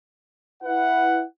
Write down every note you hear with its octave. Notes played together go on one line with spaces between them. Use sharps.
E4 B4 F#5